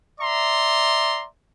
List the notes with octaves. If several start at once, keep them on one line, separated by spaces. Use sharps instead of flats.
D5 E5 A#5 C6